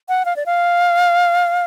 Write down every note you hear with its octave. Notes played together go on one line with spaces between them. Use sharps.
F#5
F5
D5
F5